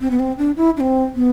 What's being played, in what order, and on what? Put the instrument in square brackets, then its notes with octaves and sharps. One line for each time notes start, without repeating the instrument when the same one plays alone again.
[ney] C4
B3
C4
D4
E4
D4
C4
B3